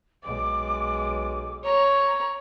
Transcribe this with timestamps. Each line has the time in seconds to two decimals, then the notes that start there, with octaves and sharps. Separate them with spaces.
0.24 B1 G#3 D6
1.65 C#5 A#5